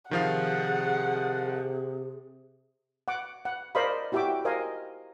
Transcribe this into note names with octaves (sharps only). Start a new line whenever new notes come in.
C3 D#3 F3 G#4 F5 F#5
F#5 D6
F#5
A#4 C5 D5 D#5 F5 B5
E4 F#4 G4 E5 G5 D6
A#4 C5 D#5 F5 G#5